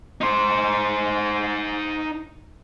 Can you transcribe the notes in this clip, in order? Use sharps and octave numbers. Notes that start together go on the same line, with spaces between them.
D#4 C5